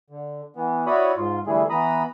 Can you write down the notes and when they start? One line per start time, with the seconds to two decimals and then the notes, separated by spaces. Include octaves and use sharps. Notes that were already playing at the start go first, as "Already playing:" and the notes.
0.10 D3
0.56 E3 B3
0.87 E4 F#4 C#5 D5 B5 D#6
1.17 G#2 F4
1.47 D3 E3 G3 A3 E4 G#4
1.70 E3 B3 A#5 B5 D#6